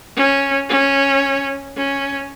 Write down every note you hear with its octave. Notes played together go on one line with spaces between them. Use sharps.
C#4
C#4
C#4